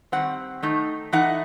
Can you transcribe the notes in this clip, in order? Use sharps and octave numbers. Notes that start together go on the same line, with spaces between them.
D#3 G3 C4 F#5
D#3 A3 D#4
E3 A3 D#4 F#5